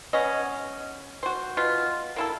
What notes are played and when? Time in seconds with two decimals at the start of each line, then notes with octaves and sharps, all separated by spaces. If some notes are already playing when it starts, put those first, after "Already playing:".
0.13 B3 C#4 D#5
1.23 F#4 C5
1.57 B2 F4
2.16 A#3 E4 A4